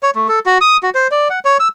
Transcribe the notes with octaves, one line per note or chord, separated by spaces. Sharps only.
C#5
A3
A4
F#4
D#6
F#4
C5
D5
F#5
C#5
E6